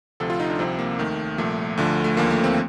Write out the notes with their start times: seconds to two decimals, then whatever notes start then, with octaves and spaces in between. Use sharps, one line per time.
0.20 D2 C3 F3 A4
0.30 F4
0.40 D#4
0.50 D4
0.59 C2 C3 F3 C4
0.79 A#3
0.99 D#2 D#3 A3
1.38 C2 A#2 F3 A3
1.78 D2 D3 F3
2.04 A3
2.17 D#2 D3 F3 A#3
2.31 A3
2.44 C4